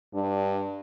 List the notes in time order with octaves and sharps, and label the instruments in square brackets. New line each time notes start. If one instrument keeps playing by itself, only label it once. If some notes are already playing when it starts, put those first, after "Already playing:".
[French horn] G2 [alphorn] D4